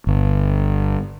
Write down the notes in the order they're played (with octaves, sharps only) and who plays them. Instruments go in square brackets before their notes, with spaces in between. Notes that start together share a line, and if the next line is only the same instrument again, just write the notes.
[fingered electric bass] G1